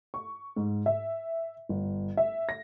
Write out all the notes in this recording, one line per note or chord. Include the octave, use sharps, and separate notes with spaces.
C#6
G#2
E5
G1
E5
A#6